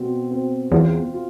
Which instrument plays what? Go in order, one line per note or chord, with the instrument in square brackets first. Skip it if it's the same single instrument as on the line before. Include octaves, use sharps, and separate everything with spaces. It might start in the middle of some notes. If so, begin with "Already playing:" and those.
Already playing: [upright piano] B2 C4
C4
[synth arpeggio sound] E2 [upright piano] F4
[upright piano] F4